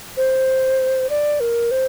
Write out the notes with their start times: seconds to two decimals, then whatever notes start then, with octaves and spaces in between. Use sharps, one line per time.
0.17 C5
1.10 D5
1.40 A#4
1.71 C5